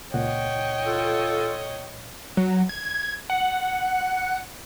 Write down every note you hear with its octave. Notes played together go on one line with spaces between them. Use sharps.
C#2 A#2 C#5 D#5 F#5 G5
F4 A4
F#3
G#6
F#5